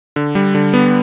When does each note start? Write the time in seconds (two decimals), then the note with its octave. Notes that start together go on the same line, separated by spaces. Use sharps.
0.16 D3
0.35 G3
0.55 D3
0.74 B3